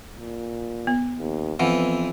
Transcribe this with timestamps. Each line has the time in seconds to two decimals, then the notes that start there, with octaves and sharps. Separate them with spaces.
0.15 A#2
0.87 B3
1.19 D#2
1.60 F2 E3 B3 F#5